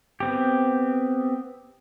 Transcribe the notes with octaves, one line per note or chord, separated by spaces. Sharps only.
B3 C4 G4